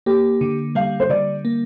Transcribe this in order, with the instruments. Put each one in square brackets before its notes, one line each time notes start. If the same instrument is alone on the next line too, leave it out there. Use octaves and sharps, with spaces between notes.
[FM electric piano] A#3 [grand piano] G4
[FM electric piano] D3
[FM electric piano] G3 [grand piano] F5
[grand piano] C5
[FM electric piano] D3 [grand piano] D5
[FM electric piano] A#3